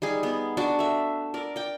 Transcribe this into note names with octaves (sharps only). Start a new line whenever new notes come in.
G3 D#4 G#4
B3
D4 F#4 D5
A3 E5
A#4 D5
D5 G5